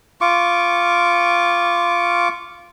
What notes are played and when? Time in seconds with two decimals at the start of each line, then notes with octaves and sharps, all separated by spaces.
0.21 F4 C#6 D6